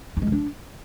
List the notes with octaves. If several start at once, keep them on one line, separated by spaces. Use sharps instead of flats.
D#4
G#3
E4
D4